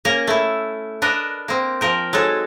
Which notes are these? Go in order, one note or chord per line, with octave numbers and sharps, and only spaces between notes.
A#3 C#4 A#4
A3 E4
D4 A#4 B4 D#5
A#3 C4
F3 A#4 G5
F#3 G#3 D#4 A4